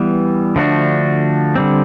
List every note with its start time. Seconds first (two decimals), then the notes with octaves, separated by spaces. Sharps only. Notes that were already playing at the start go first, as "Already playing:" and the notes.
Already playing: E3 G3 B3
0.56 D3 F3 A3 D4 F#4
1.55 D3 G3 C4